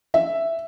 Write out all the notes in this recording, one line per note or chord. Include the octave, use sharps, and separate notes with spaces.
E5